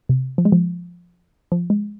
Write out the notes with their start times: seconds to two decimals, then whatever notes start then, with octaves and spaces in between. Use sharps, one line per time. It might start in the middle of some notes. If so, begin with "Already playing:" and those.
0.09 C3
0.38 F3
0.45 G#3
0.52 F3
1.52 F3
1.70 G#3